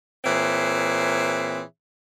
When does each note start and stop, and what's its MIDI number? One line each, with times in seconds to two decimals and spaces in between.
0.24 1.62 46
0.24 1.62 52
0.24 1.62 60
0.24 1.62 68
0.24 1.62 73
0.24 1.62 76